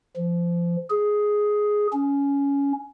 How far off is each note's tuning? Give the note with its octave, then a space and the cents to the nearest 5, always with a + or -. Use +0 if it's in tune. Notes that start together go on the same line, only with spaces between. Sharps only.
F3 -25
G#4 +5
C#4 +15